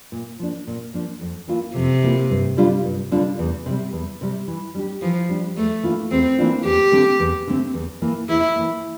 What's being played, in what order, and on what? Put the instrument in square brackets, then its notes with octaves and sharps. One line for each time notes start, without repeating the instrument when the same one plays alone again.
[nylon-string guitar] A#2
F3 A#3 D4
A#2
F3 A#3 D4
F2
E3 A#3 F4
[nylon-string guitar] F2 [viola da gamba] C3
[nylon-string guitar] E3 A#3 F4
G2
D3 G3 D4 F4
G2
D3 G3 D4 F4
E2
C3 G3
E2
C3 G3
E3
G3 D4 G4
[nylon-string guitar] E3 [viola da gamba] F3
[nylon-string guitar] G3 D4 G4
[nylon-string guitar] E2 [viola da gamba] A3
[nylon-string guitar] E3 A#3 D4 F4
[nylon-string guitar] E2 [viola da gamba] C4
[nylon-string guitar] E3 A#3 D4 F4
[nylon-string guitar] E2 [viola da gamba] G4
[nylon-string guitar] D3 A3 C4
E2
D3 A3 C4
E2
E3 A#3
[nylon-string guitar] E2 [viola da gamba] E4
[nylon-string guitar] E3 A#3